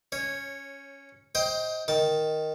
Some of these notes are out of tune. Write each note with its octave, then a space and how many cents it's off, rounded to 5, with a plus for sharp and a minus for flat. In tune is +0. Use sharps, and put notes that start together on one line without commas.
C#4 +0 C#5 -15
C5 +10 D#5 +25 G5 +0
D#3 +0 A5 +0